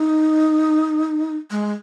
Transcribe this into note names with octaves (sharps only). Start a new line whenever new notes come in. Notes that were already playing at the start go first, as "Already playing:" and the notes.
Already playing: D#4
G#3